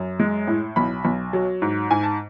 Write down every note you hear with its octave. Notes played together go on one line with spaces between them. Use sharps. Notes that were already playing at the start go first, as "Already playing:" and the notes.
Already playing: F#2
G#3
A2
B1 B5
B1
F#3
G#2
G#2 G#5
A5